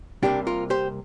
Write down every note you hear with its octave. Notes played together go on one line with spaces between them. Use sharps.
C2 C3 A#3 D4 G4
F4 A#4
G4 C5